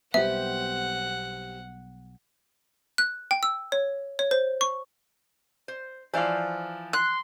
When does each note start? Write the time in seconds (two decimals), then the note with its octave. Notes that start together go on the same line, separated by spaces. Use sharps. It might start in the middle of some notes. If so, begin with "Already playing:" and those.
0.14 B1 G3 B3 C4 G4 E5 F#5
2.98 F#6
3.31 G5
3.43 E6
3.72 C#5
4.19 C#5
4.31 C5
4.61 C#6
5.68 C5
6.13 E3 F3 C5 D5 F5
6.93 C6 F#6